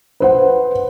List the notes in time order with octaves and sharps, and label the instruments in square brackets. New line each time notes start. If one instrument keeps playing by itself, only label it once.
[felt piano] B4 C5 F#5